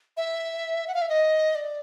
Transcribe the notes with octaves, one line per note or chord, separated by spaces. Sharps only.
E5
F#5
F5
E5
D#5
D5